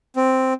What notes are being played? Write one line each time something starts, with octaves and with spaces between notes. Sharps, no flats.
C4